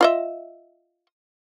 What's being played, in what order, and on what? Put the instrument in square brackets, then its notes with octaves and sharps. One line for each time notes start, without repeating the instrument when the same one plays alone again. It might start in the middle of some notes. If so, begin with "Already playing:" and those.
[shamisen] F4 D#5 E5